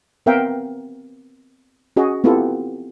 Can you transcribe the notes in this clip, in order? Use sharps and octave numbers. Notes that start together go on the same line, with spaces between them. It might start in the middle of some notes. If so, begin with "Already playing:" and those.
B3 C4 A#4 E5 F5 G5
C#4 F#4 G#4 D#5
B3 C4 E4 F4 G4 A4